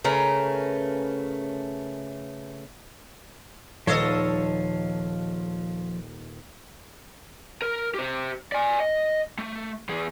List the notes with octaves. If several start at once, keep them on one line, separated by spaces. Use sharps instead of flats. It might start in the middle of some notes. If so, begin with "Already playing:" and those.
C#3 A3 A#4 B4
D#1 F3 A4 C#5 D#5 F5 E6 A#6
A#4
G4 C5
D5 G#5
D#5
A3
E2 G#4